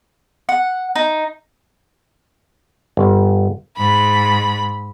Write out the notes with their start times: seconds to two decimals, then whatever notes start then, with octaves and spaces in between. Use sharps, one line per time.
0.49 F#5
0.96 D#4
2.97 G1
3.78 G#2 B5